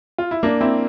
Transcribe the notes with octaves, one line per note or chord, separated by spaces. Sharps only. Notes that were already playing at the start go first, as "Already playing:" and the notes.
F4
E4
A#3 D4
C4 E4